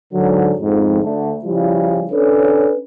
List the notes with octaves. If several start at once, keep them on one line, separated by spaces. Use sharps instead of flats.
G#2 D3 F#3
F2 G#2
D2 D3 A3
C#3 F3 G3 E4
C#4 D4 A4 B4 C#5